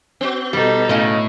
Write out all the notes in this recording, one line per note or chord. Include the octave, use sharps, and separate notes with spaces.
B3 F#4
B2 G3 D#4 A4
A2 C#3 D#5